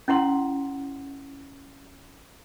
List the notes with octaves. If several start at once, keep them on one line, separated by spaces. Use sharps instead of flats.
C#4 E4 F#5 C6